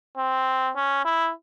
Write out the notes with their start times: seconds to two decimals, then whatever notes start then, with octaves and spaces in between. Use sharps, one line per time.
0.18 C4
0.76 C#4
1.05 E4